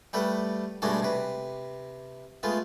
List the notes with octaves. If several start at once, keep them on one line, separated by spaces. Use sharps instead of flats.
G3 A3 A4 B4 F#5
G2 B2 G#3 A3 D4 F#4
C3 B4
G#3 A3 B3 F4